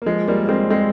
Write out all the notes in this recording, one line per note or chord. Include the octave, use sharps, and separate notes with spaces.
A#3
F3 G#3
G3 A#3
A#3
G#3 C4
G#3 C4